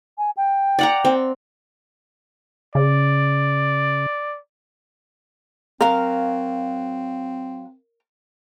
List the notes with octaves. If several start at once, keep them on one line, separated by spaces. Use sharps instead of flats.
G#5
G5
D5 F#5 A#5
C4
C#3 D5
F#3 C4 A#4 F5